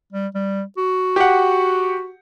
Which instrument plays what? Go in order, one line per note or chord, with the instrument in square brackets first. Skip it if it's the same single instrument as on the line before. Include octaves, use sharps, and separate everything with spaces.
[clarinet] G3
G3
F#4
[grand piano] G4 F#5